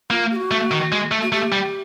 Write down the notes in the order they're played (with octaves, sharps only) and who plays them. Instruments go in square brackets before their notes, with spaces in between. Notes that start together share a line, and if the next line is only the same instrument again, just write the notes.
[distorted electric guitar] A#3 [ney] F4
[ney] G4
F#4
[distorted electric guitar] A3
D#3
G#3
A3
[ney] F#4
[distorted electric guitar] A3 [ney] G4
[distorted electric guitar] G3